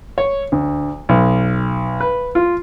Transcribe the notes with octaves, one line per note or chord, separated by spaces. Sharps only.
C#5
D2
B1
B4
F4